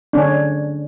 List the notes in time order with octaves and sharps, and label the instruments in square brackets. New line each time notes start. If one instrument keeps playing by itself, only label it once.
[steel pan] D3 C#4 D4